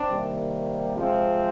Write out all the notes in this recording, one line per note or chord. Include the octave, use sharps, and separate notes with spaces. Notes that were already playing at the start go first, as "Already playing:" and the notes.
Already playing: C4 D4
C3 D#3 G3 A#3
C3 F3 G#3 C4